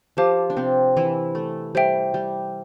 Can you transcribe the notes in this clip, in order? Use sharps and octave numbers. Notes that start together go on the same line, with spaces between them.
F3 F4 G4 C5 F5 A5 D6
D4
C3 C4
E3 E4
A3
G3 C5 E5 G5
G3